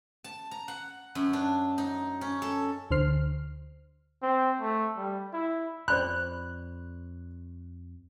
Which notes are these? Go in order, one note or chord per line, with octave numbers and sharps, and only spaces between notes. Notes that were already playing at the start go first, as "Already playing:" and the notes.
A5
A#5
F#5
F#2
D4
D#4
C#4
A4
D2 D3 C5 F6 C7
C4
A3
G3
E4
F2 C5 D5 B5 F#6